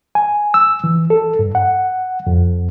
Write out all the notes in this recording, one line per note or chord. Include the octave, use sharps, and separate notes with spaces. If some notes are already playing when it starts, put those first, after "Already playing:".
G#5
E6
E3
A4
G2
F#5
F2